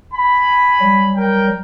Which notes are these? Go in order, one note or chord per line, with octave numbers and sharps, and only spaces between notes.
G#5 B5
F#3 G3
A#4 G5